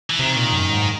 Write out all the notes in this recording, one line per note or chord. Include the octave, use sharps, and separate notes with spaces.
E3
C3 D#3
A#2
F#2
G#2